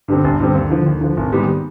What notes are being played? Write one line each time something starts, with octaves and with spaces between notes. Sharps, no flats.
G2 D3 G3 C4
G1
G2 D3 G3 C4
D#2
D3 F3
D#2
D3 F3
G#1
G#2 D#3 G3 B3